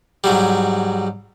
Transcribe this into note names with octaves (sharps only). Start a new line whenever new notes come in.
G#2 F#3 G3